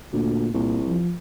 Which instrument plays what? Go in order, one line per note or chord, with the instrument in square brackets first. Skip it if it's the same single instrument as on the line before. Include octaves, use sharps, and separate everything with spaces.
[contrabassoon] D2 [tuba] A#2
[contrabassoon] C2 [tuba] A#2
[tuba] F3